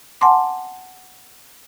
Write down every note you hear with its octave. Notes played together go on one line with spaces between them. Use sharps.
F#5 G#5 A5 C6 D6